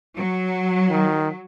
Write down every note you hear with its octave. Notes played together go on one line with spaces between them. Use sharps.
F#3
D#3